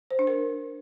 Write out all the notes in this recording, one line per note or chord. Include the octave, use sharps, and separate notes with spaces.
C5
D4
A#4